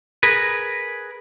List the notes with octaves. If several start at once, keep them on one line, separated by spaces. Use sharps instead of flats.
G#4 A#4 B4